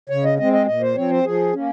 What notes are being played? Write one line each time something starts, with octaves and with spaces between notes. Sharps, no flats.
C#3 C#5
D#5
G#3 C4 D#5
D#5
A#2 D#5
C5
F3 C4 C#5
C5
F3 G#4
A#3 C#4